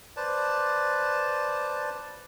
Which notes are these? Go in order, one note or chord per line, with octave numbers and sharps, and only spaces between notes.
B4 C5 D5 A5